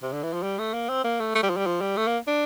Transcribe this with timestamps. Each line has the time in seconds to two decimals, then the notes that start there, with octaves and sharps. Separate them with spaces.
0.03 C3
0.12 D3
0.23 E3
0.33 F3
0.43 G3
0.59 A3
0.74 A#3
0.89 C4
1.05 A#3
1.20 A3
1.35 A3
1.43 G3
1.50 F3
1.57 G3
1.66 F3
1.81 G3
1.97 A3
2.07 A#3
2.27 D4